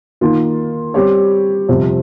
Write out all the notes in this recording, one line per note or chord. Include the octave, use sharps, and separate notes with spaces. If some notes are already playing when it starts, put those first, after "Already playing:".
D#3 A#3 F4
G3 C4 G4 C#5
F2 C3 G3